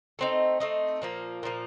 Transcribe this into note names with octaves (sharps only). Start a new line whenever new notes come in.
A3 C4 D#4
A3 C4 D#4
A#2 F3 A#3
A#2 F3 A#3